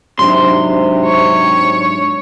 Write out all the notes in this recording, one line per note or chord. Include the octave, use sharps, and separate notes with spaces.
G#2 C3 F#3 D4 C6
C#5